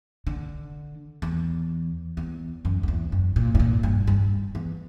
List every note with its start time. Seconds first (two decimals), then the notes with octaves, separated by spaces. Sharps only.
0.27 D3
1.22 E2
2.17 E2
2.65 F#2
2.83 F#2
2.88 E2
3.12 F#2
3.36 A#2
3.55 G2
3.60 A#2
3.83 G2
4.07 G2
4.55 E2